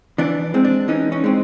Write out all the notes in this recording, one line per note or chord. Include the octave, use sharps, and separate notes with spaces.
E3 D4
G#3 C4
D4
E3 C#4 D#4
C#4 D#4
G#3 C4